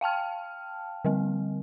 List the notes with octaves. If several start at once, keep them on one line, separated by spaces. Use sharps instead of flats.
F5 G5 A5 F6
D3 G3 C4